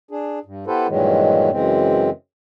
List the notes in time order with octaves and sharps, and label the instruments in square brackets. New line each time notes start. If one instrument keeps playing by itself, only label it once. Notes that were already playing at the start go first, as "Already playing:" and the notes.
[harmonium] D4 G#4
G2
B3 E4 G4 A4 B4 C5
G2 A#2 D#3 E3 F#3 G#3
F#2 C#3 E3 G#3 C4